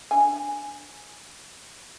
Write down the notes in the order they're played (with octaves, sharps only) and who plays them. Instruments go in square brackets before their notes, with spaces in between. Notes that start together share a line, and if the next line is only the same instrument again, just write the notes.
[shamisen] D4 G#5